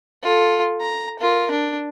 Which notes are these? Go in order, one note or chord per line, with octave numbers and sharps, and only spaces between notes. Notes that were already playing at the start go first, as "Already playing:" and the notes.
F4 A4
A#5
F4 A#4
D4